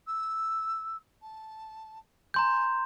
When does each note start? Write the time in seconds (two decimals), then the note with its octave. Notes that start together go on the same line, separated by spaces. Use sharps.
0.07 E6
1.22 A5
2.34 G#5 A#5 C6 G6